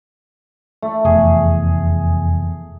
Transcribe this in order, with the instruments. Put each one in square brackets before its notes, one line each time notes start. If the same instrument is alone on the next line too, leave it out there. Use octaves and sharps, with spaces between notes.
[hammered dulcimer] A3
[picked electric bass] F1 E2 [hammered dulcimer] G#4